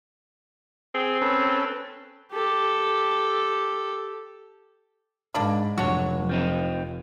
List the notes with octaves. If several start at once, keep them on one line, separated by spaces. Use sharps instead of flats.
C4 G#4
C#4 A4 B4
G4 A4
G#2 A#3 D4 B5
F1 F#3 D4 F#4 C#5
F3 C4 D#4